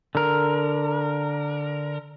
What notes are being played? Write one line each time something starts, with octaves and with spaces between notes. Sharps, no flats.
D3 A#4